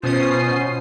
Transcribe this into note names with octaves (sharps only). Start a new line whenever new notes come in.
B2 C#4 F4 C5 D#6 C7